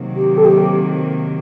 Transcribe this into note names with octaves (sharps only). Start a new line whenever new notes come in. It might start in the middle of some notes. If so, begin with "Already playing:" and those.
Already playing: C3 D#3 F#3 A#3
G4
A4
G4